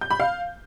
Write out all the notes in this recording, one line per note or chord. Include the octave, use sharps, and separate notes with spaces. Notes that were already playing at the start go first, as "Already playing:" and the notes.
G6
B5
F5